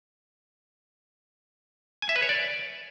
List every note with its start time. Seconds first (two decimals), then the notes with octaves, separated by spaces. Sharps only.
2.02 G#5
2.09 E5
2.16 B4
2.22 C#5
2.29 D5